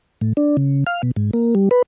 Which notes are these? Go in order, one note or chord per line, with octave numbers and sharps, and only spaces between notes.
A2
D4
C#3
F5
B2
G#2
A#3
G3
B4